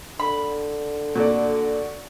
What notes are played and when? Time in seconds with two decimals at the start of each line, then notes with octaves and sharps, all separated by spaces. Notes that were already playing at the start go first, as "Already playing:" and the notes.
0.20 D3 B5
1.15 A#2 F#4 A4 D5